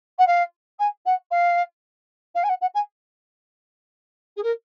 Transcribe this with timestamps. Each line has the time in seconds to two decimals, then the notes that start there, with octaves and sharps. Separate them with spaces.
0.18 F#5
0.27 F5
0.79 G#5
1.05 F#5
1.31 F5
2.35 F5
2.43 G#5
2.49 F#5
2.61 F#5
2.74 G#5
4.36 G#4
4.43 A#4